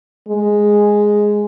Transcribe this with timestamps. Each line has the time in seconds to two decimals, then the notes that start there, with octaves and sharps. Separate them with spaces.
0.28 G#3